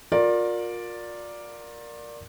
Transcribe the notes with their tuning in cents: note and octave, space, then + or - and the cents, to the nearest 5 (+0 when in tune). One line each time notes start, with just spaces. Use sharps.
F4 +35 A#4 +5 D5 +0